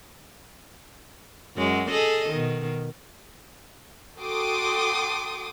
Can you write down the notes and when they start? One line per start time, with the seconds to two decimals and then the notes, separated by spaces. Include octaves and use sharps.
1.56 F#2 F#3 G#3
1.91 G#4 A4 D#5
2.30 B2 D#3
4.19 F#4 A4 G5 C6 D6 D#6